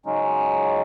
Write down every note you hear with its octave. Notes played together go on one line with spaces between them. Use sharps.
C#3 F#3 G#3 C#4 D#4